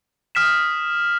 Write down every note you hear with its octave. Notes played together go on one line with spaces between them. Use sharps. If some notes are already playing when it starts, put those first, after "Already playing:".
D#6 F6 B6 E7